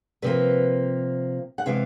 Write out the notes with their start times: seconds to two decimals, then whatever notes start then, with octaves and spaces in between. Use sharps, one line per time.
0.22 C3 F3 A#3 B4
1.58 F#5
1.66 C3 E3 G#3 F5